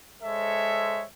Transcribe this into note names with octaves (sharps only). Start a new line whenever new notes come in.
G#3 A4 C5 C#5 E5